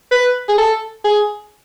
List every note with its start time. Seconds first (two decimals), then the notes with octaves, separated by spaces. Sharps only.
0.11 B4
0.48 G#4
0.58 A4
1.05 G#4